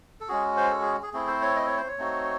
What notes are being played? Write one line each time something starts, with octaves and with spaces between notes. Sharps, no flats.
A4
G#3 C#4 F#4 G#4
C5
A4
G#4
G#4
A3 C4 E4 G#4
C5
C#5
D#5
C#5
C5
C#5
A3 C4 D#4 F#4